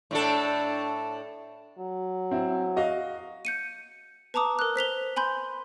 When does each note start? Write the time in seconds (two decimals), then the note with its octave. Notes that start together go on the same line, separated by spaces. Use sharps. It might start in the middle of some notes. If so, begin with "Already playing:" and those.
0.11 A2 D4 A4
1.79 F#3
2.31 C4 E4
2.76 F#4 D#5 F5
3.45 G6 C#7 D#7
4.34 B4 A5 A#5 D6 D#6
4.59 A#4 F#6
4.76 C5 B6 F7 G7
5.16 G#5 B5 C6 G6